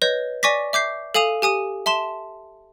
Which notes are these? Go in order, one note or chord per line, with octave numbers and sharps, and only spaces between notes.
B4 C#5 D#5 G6
D5 G#5 C#6 D6 A#6 B6
E5 D6 G6 C7
A4 F5 G#5 D#6 D#7 F7
G4 G#5 D#6 D#7
E5 A5 C6 E7